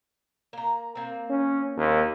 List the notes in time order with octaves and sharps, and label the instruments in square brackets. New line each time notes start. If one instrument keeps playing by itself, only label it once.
[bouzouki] A#3 A#5
A#3 C4
[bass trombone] C#4
D#2